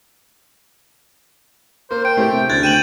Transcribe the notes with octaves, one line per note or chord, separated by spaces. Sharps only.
A#3 C5
G5 D7
A2 A3 C4 G4
C3
D2 C#3 F#6 G#6 A6
G5 D#7 E7 F#7